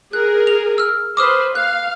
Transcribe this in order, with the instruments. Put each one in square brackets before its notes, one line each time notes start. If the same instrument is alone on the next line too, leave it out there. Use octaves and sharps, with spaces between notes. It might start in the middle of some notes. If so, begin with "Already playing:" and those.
[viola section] G#4 A#4 [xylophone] F#6
[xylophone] F7
E6 F6
[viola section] B4 C5 [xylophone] D6 D#6 F6
[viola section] F5 [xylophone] F#6